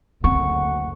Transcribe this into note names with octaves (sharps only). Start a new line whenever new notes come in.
F#1 D2 C4 F#5 C#6